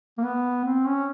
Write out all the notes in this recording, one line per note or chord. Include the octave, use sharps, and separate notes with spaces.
A#3
B3
C4
C#4